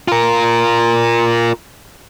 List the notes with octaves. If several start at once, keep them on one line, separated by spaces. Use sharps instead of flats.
F4 A#4